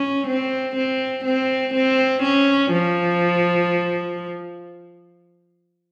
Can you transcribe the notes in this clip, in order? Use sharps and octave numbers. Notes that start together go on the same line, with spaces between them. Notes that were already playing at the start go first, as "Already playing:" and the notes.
Already playing: C#4
C4
C4
C4
C4
C#4
F3